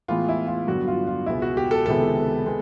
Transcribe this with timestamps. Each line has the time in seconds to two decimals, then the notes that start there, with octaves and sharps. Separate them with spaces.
0.08 A2 E3 G#3 B3 F4
0.29 E4
0.47 F4
0.68 G2 D3 F#3 B3 F#4
0.88 F4
1.07 F4
1.26 C#2 B2 G#3 B3 E4
1.42 F#4
1.57 G4
1.71 A4
1.86 C#2 C3 D#3 G#3 B3 A4
2.46 G#3 B3